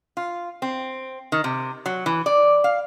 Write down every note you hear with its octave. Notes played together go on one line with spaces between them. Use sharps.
F4
C4
D#3
C3
F#3
E3
D5
F5